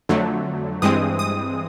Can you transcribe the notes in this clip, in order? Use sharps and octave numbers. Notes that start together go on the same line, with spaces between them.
F2 D3 F#3 A3
G2 E3 G#3 C4 D#6
D#6